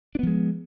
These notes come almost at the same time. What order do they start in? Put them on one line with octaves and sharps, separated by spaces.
D4 B3 F3 G#3